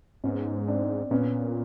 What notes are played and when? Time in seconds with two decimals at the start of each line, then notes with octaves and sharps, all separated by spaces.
0.24 G#2 B3 C#4
0.68 C4 D4
1.11 A#2 B3 C#4